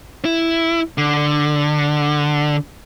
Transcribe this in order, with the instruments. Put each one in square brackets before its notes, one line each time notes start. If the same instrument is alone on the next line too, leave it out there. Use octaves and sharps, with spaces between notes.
[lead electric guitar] E4
D3